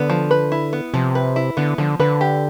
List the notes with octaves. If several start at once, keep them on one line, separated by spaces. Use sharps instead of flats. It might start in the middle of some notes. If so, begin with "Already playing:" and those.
Already playing: D3 B3
F3
B4
E4
B3
C3 F3
B4
E4
D3 B3
D3 F3
D3 B4
G4